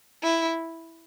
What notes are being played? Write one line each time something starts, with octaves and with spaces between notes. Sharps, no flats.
E4